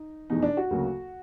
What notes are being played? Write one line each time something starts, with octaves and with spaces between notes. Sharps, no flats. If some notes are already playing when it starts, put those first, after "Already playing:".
Already playing: D#4
F1 E2 B2 D#4
D4
F#4
D2 C#3 F#3 A#3